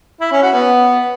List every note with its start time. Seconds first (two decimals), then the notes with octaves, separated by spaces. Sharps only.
0.21 E4
0.31 C#4
0.42 F#4
0.53 B3